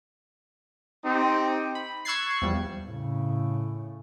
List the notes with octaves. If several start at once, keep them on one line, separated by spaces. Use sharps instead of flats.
C4 D#4 G4
B5
C#6 E6 F#6 G#6 A6 C7
E2 F3 G3
A2 C#3